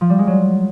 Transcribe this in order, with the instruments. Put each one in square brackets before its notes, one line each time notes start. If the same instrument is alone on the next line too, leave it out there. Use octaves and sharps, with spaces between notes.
[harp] F3
G3
G#3
F#3